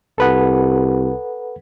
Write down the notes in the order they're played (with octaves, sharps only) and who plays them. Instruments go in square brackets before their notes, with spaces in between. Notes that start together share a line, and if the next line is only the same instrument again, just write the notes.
[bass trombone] C2 [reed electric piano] A4 B4 F#5